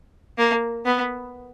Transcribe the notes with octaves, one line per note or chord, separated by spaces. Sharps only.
A#3
B3